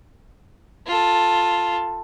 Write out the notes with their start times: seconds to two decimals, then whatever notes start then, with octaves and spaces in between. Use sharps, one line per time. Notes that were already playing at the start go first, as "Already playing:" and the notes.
0.87 F4 A4